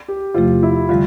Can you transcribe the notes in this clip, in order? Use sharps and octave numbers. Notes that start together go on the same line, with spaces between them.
G4
E2 C3 F3 A3 F4
E4
D3 G3 F4